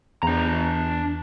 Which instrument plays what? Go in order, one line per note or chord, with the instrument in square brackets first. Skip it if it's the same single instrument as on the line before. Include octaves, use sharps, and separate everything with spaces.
[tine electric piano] E2 [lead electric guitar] D4 A#5